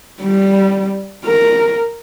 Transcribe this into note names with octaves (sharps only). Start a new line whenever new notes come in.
G3
A#4